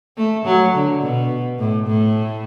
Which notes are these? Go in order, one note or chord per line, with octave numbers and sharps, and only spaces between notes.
A3
F#3
D3
B2
A2
A2